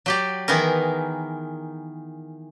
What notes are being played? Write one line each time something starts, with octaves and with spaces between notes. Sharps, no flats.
F#3 G4 D5
D#3 E3 B3 D#4 G#4 A#4